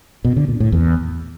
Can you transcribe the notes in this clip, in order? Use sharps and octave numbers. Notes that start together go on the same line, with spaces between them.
B2
D3
A#2
A2
E2